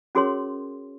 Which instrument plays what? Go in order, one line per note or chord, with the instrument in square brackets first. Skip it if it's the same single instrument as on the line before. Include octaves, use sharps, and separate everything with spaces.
[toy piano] C#4 F#4 G#4 A#4 C#5 C6